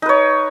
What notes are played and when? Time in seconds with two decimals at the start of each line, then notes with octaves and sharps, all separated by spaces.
0.02 D#4
0.06 B4
0.09 C#5